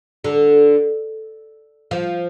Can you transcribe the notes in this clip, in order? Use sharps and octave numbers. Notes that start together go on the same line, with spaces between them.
D3
F3